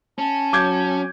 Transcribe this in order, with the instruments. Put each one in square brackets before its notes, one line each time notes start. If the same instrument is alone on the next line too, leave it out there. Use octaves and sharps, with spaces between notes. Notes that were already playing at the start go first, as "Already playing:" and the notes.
[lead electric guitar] C#4 [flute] A5
[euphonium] F#3 [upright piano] D6 G6 G#6